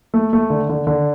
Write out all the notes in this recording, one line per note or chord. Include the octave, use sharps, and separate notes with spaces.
A3
A3
D3
D3
D3